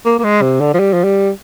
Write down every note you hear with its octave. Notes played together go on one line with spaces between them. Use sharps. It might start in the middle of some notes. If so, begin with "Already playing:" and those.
A#3
A#3
G#3
C3
D3
F3
G3
F3
G3